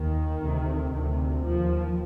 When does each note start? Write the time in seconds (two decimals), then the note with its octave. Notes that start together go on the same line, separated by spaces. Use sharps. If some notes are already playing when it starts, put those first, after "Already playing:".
Already playing: D#2 D#3
0.42 D2 C3
0.93 D2 C3
1.45 D#2 F3